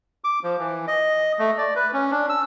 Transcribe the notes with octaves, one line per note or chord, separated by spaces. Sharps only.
D6
F3
E3
D#5
A3
D5
B4
C#4
D4
E6